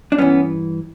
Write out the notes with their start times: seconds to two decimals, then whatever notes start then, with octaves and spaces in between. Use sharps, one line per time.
0.12 D4
0.18 G2 E3 B3 C#4